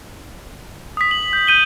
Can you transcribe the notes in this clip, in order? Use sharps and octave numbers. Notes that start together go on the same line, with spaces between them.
D#6 B6
F#7
G6
G6 D#7 G7